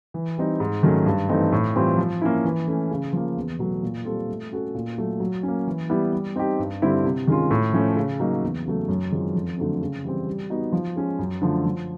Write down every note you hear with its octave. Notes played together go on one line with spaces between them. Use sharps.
E3
G3 C4 D#4
G#2
D#3 F#3 A3 C#4
G2
E3 A3 C4 D#4
A2
E3 G3 C4 F4
F3
A#3 C#4 E4
E3
A3 C#4
C#3
F3 A#3
E2
B2 F#3 A3
A#2
G3 C4 F4 A4
A3
C#4 F#4 A4
A#2
F#3 A3
F#3
A#3 C#4
E3
G3 B3 E4
G3
C4 D#4 G4
G2
D3 G3 C4 E4
C3
D#3 G#3 C#4 F4
A2
F3 A3 C#4
C#3
F#3 A#3 D#4
E2
C#3 F#3 A3
F#2
D#3 G#3 C4 F4
F2
D3 F#3 A3 C4
C#3
E3 G3 C4
G3
B3 D#4 F#4
F3
G#3 C#4
F#2
D3 F3 A3
F3